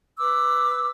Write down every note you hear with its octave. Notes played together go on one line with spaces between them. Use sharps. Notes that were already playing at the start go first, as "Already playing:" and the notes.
B4 D6 E6